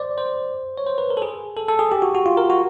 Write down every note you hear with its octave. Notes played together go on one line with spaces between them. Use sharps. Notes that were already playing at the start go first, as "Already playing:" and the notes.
Already playing: C5 D5
C5
C#5
C5
B4
A#4
A4
G#4
A4
A4
G#4
G4
F#4
F#4
F4
A#4
F#4